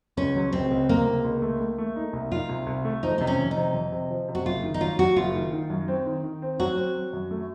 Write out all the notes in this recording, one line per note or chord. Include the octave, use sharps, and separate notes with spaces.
C#2 C#4
F#3
C#2 C4
C#2
C3 A#3
C#2
C#2
A3
A3
A3
D#4
C2
D#4 F4
C2
C2
A3
F3 D#4
C3 D#4
C#4
F2
D#4
C3
F2
C3
F3
C3
F#4
F#1 F4
D#3
D#4
F#3 F4
F#3 F#4
F#1 F4
D#3
D#3
F#2
C4
D#3
D#3
C4
F#3 F#4
C4
F#3
F#2
A3